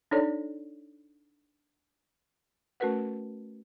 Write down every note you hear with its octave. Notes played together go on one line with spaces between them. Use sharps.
D4 D#4 A4 C#5 D5
A3 C#4 F#4 A#4 B4 F#5